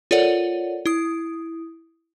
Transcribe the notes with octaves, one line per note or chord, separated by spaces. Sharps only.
F4 A4 A#4 C#5 D5 F#5
E4 D#6